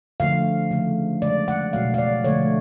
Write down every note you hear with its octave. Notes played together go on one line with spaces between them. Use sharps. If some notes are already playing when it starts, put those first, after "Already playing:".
D3 F3 A3 F5
C#3 F3 A3
C#3 G#3 D5
F#5
B2 F#3 A3 F5
F5
D5
D3 F3 A3 C#5